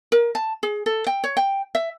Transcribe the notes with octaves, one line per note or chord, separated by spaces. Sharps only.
A#4
A5
G#4
A4
G5
C#5
G5
E5